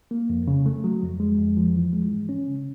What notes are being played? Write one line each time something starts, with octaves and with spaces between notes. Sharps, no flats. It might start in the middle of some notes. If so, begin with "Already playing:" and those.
A#3
F2
C#3
A3
F#3
F2
G#3
F2
F3
E3
G#3
G#2
C#4
C#3